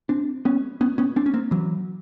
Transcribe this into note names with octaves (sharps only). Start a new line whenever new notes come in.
C4 D4
B3 C#4
B3 C#4
B3 C#4
C4 D4
C#4
A#3 C4
E3 F#3